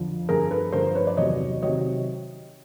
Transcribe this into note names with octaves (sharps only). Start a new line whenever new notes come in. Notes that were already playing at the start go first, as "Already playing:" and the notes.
Already playing: F2 D3 F3
G2 D3 F3 G#4 A#4
A4 B4
G2 D3 F3 A#4 C5
B4 C#5
D5
E2 C3 D#3 F#3 C#5 D#5
C3 D#3 F#3 C#5 D#5